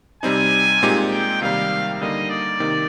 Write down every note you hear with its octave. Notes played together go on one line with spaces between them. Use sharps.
C3 G3 C4 D#4 G#5
A#2 G#3 C4 D#4 G4
G5
C3 D#3 G3 A#3 F5
D3 G3 A#3 D#4 D#5
D5
C3 D#3 A#3 D#4